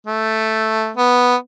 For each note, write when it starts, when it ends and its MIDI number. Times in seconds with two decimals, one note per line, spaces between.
0.06 0.91 57
0.97 1.36 59